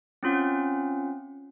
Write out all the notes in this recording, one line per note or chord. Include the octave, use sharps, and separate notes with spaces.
C4 C#4 F4 F#5